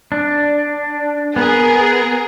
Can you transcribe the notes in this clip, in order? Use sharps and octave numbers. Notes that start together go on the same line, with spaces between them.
D4
B3 G#4 A#4